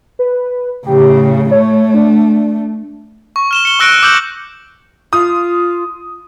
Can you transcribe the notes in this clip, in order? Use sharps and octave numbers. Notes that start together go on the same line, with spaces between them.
B4
A2 C#3 G4
A3 C#5
D4
C#6
F6 E7 G7
C#7 G7
C#6 E6 F#6 A#6 C#7 D7
D6 E6 G6 F#7
F4 D#6